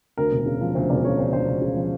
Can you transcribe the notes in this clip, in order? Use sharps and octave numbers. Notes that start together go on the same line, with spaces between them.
D2 A#4
E1
C#3
F3
D2 C5
E1 D5
C#3 C#5
F3 C5
D2 C5
E1
C#3
F3